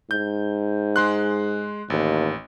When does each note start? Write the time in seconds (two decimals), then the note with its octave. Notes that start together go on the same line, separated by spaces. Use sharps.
0.11 G#2 G6
0.96 G#3 C6 F#6
1.90 A1 D#2